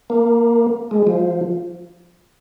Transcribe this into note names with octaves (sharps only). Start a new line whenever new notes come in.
A#3
G#3
F3